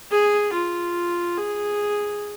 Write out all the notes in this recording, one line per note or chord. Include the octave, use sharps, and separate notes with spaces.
G#4
F4
G#4